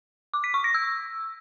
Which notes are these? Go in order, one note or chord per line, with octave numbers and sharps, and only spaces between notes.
D6
B6
C#6
A#6
E6